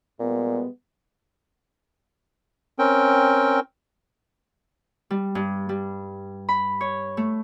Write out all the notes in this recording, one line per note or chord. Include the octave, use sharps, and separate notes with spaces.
A#2 G3 G#3 B3
C4 C#4 A#4 G5
G3
G2
G3
B5
C#5
A3